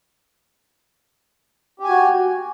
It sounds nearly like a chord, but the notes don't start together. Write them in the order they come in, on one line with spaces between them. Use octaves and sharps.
G4 G#5 F#4